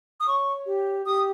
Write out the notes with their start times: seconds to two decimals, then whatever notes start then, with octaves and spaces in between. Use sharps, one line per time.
0.20 D#6
0.26 C#5 C#6
0.66 G4
1.06 G4 D#6